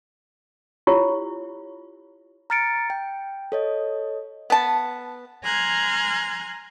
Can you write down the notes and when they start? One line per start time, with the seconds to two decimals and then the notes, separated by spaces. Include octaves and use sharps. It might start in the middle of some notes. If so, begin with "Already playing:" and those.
0.87 E4 F4 G4 C#5
2.50 A#5 F6 A6 C#7 D7
2.90 G5
3.52 A4 C#5 D#5
4.50 B3 A5
5.43 G#5 A#5 C6 F6 F#6 G#6